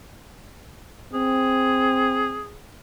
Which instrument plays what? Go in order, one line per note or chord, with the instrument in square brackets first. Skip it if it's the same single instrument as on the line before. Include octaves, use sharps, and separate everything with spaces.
[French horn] C4 [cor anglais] G#4